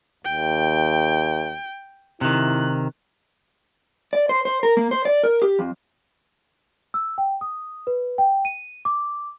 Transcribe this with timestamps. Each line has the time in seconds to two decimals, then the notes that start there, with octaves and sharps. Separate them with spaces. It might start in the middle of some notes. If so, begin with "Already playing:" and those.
0.25 D#2 G5
2.21 C3 D#3 E4 F#6
4.13 D5
4.29 C5
4.45 C5
4.63 A#4
4.77 A#3
4.91 C5
5.05 D5
5.24 A#4
5.42 G4
5.59 F2
6.94 E6
7.18 G5
7.41 D#6
7.87 B4
8.18 G5
8.45 D#7
8.85 D6